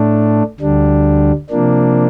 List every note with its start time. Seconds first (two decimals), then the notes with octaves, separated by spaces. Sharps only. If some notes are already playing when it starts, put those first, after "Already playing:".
Already playing: A2 A3 D4
0.60 D2 D3 G3 D4
1.49 C3 F3 A#3 D4